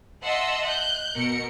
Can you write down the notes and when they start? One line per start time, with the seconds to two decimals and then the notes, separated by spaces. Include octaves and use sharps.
0.24 D#5 E5 F#5 A5 C6 E6
0.65 F#6 G6
1.17 B2 A#4 C#7